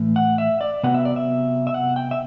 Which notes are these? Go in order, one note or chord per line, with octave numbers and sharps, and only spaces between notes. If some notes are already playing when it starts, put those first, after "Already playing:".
Already playing: A2 E3 A3
F#5
E5
D5
C3 F#3 B3 F#5
E5
D5
E5
E5
F#5
G5
E5